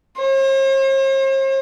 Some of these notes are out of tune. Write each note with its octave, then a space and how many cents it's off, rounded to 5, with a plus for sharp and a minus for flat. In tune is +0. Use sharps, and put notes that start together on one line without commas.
C5 +45